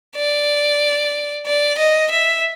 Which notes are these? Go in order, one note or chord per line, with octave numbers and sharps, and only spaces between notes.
D5
D5
D#5
E5